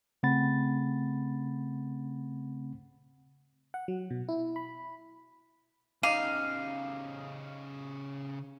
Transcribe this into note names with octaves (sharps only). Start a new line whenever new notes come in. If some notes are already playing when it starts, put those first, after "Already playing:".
C#3 A3 C4 F#5 B5 A6
F#5
F#3
B2
E4
B5
C#3 D#4 G4 F5 D6 D#7